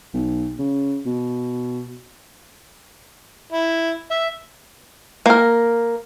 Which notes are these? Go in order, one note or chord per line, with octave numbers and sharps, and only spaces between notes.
B1
C#3
B2
E4
E5
A#3 A#4